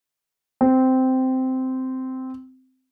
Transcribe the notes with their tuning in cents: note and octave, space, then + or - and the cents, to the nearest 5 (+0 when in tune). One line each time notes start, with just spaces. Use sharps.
C4 -10